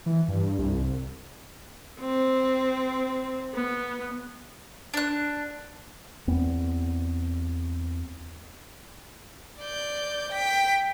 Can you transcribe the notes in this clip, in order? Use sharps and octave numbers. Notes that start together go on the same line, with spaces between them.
E3
G2
C2
C4
B3
D4 F#6
E2 B3 C4
D5 G6
G5 B6